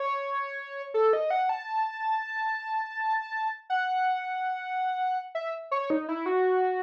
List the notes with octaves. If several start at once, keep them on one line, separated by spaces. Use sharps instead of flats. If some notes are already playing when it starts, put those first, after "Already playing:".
Already playing: C#5
A4
D#5
F#5
A5
F#5
E5
C#5
D#4
E4
F#4